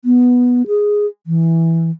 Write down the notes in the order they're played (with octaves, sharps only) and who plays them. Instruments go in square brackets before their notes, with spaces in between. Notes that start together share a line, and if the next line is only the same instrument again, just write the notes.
[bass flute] B3
G#4
E3